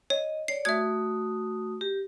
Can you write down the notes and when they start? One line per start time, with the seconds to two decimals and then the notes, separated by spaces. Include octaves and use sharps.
0.10 C#5 D#5
0.48 C#5 D5 C7
0.65 A3 F#4 E5 D#6 G#6
1.81 G4